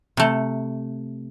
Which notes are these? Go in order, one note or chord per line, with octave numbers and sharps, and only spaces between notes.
C3 A3